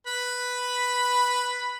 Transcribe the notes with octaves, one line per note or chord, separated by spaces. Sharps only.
B4 B5